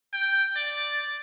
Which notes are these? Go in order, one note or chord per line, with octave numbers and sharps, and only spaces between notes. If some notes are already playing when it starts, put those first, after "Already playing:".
G5
D5